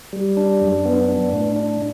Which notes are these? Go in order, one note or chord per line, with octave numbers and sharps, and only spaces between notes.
G3
D4
F#2
B3
D4
A2
D4